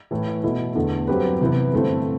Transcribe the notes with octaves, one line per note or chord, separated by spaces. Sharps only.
A2 E3 A3
B2 A3 E4
E2 D3 A3
G2 F#3 C4 G4 B4
C3 E3 B3
G2 D3 A3 C4 E4